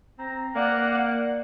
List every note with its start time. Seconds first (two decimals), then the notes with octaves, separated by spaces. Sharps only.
0.19 C4 A#5
0.55 A#3 D5 F#5